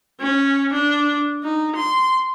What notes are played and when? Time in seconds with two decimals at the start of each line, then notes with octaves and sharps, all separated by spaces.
0.20 C#4
0.73 D4
1.43 D#4
1.76 C6